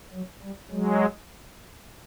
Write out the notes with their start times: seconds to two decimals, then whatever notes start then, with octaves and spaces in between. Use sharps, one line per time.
0.13 F#3
0.42 G3
0.71 F#3 G#3